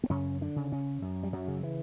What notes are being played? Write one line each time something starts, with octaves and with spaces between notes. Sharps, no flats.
B3
F#2 C#3 C#4
D3 D4
C#3
C#3 C#4
F#2
G3
F#2 F#3
C#3
E3